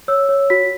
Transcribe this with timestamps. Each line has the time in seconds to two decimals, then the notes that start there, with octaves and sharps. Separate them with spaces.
0.08 C#5 E6
0.29 C#5
0.50 F#4 B6